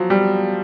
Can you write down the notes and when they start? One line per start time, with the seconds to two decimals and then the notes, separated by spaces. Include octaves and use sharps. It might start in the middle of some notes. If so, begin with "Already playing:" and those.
Already playing: F3 F#3
0.10 G3